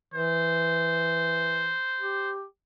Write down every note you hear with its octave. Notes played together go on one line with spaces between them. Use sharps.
E3 C5
G4